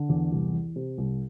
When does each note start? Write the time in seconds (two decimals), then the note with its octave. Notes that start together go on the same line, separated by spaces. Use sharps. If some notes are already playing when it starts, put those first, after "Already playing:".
Already playing: D3
0.09 E2
0.31 C2
0.53 E3
0.76 C3
0.98 C2